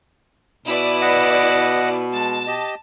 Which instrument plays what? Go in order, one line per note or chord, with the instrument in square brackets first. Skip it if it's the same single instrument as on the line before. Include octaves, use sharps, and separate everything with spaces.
[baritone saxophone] B2 [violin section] E4 B4 D5
[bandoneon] D#5 F#5
[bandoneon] G#3 [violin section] A5
[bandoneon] G4 D#5